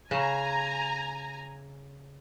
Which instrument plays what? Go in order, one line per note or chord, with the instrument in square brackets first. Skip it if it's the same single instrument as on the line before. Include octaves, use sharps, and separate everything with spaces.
[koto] C#3 [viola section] G#5 A#5